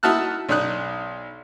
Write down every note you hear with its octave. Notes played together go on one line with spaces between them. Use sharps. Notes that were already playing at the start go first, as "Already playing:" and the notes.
D#4 E4 F#4 A5 F6 F#6
B1 D4 D#4 F#6